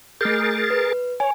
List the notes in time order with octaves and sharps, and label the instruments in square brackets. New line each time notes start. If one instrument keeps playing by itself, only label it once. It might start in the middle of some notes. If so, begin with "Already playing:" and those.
[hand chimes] A3 F6 G6 [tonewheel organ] G#4 A#4 A6
[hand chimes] B4
[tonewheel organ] C#5 [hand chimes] G#5